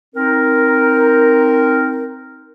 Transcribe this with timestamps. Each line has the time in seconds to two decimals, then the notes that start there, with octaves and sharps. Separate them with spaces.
0.15 C4 D#4 A#4